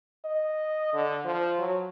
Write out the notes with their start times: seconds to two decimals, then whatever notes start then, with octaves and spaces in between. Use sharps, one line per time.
0.25 D#5
0.94 D3
1.25 F3
1.59 F#3